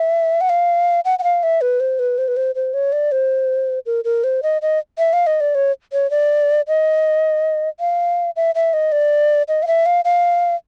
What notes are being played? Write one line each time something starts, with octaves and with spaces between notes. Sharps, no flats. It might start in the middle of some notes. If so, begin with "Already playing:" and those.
Already playing: E5
F#5
F5
F#5
F#5
F5
E5
B4
C5
B4
C5
B4
C5
C5
C#5
D5
C5
A#4
A#4
C5
D#5
D#5
E5
F5
D#5
D5
C#5
C#5
D5
D#5
F5
E5
E5
D#5
D5
D#5
F5
E5
F5
F5